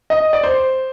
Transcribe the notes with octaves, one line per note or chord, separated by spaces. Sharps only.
D#5
D5
C5